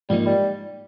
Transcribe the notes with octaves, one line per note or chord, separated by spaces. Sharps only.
G#2 F3 G3 A#3 D#4
G3